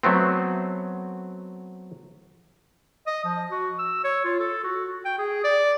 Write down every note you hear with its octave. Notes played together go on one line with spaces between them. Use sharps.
F#3 A3 B3 C4
D#5
F3
F#4
E6
C#5
F4
A4
F#4
G5
G#4
D5